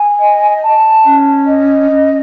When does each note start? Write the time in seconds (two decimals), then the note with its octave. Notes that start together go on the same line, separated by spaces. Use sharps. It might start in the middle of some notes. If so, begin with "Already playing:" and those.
Already playing: G#5
0.19 D#5
0.62 A5
1.05 C#4
1.47 D#5
1.90 C#4